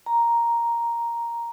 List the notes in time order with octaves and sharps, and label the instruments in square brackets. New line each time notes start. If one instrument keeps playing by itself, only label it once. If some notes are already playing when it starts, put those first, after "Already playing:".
[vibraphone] A#5